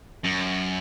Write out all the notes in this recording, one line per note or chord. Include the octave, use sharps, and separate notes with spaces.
F#2